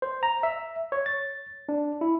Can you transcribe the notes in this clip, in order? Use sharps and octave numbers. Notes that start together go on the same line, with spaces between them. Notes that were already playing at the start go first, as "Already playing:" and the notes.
C5
A#5
E5
C#5
A6
D4
E4